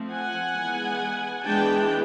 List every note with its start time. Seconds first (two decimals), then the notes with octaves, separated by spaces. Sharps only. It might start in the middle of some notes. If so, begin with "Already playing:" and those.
Already playing: F3 A3 C4
0.11 F#5 G#5
0.55 E3 G#3 B3
1.45 E3 G#3 B3 D4 G5 A5